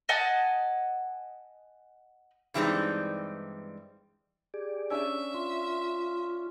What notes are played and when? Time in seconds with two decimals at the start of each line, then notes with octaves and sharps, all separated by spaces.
0.09 D#5 F#5 G#5 A5
2.54 G2 E3 G3 G#3 C4 D#4
4.54 G4 G#4 D5
4.91 C#4 D4 E5 G#5 E6
5.34 F4 C6